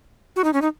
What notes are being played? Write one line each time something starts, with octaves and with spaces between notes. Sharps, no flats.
F#4
D#4
C#4
D#4